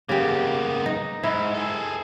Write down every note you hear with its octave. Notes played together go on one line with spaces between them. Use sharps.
C#3 A#3 B3 G4
D#4
G#2 E4
G#4 A4